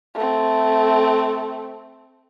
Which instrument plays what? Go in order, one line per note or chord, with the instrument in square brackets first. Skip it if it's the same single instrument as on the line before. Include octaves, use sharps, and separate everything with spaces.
[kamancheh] A3 C4